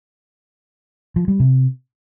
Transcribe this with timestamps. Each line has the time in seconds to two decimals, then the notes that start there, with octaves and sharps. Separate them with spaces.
1.16 F3
1.28 G3
1.40 C3